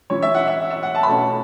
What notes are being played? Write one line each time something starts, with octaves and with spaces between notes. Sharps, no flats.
E3 C#4 E4 C#5
E5
F#5
E5
E5
F#5
A5
B5
B2 A3 C#4 A5